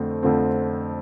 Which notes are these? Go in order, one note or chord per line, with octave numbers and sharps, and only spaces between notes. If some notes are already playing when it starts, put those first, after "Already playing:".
Already playing: F2 D3 F3 A3 C4
F2 D3 F3 A3 C4